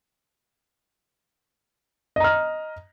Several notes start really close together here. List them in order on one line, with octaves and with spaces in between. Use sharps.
D#5 A#5 F6